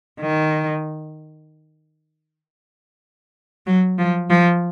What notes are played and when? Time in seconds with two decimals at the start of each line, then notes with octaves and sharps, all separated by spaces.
0.20 D#3
3.66 F#3
3.98 F3
4.30 F3